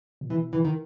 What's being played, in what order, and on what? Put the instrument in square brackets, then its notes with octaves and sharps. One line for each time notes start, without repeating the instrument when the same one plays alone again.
[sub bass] A#2
[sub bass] B2 [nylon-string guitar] E3
[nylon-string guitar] E3
D#3